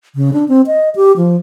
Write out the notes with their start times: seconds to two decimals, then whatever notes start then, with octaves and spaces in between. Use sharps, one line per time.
0.15 C#3
0.33 D4
0.48 C4
0.67 D#5
0.96 G4
1.17 F3